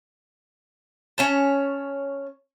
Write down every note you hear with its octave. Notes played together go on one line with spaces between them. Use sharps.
C#4 C#5 A5